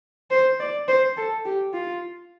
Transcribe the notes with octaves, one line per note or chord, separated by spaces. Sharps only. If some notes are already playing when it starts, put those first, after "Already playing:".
C5
D5
C5
A4
G4
F4